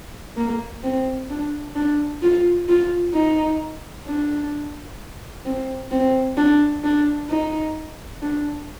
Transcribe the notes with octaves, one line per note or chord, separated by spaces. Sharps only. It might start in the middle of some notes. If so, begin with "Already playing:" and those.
A#3
C4
D4
D4
F4
F4
D#4
D4
C4
C4
D4
D4
D#4
D4